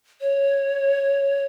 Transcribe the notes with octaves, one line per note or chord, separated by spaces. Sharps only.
C#5